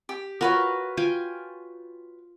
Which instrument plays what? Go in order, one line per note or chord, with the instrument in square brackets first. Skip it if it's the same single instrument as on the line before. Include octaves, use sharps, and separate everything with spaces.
[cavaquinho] G4
[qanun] F4 A#4 [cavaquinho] F#4 B4 C#5
[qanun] F4 G5 G#5